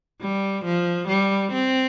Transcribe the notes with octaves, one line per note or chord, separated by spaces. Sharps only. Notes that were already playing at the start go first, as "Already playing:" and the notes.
G3
F3
G3
C4